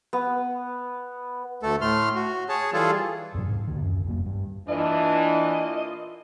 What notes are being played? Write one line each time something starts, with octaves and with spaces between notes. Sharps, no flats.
B3
D2 A3 A4
A2 A3 C6 F6
F#4
G#4 C#5 A5
E3 G3 F4 G#4 A4
E2 G2 B2 F#3
G#2 B3 D4
D2 D#3
F#2
F1 B2 A#3
G2
A#2 E3 D4 F4 D#5